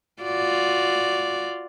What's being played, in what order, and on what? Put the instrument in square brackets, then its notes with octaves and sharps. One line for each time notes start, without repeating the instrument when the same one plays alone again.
[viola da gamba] F4 F#4 D5